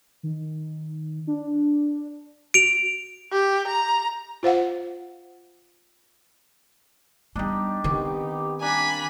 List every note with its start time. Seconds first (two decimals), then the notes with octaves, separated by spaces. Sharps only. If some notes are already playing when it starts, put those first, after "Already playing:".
0.23 D#3
1.27 D4
2.54 F#4 D7 F7
3.32 G4
3.67 A#5
4.43 F4 C5 F5 F#5
7.36 G3 B3 D4 D#4 G4
7.84 D#3 B3 C4 D#4 G4 C#5 D6
8.60 G3 A#3 D4 G#5 B5